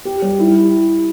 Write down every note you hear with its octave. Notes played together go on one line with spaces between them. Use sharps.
G4
G3
E4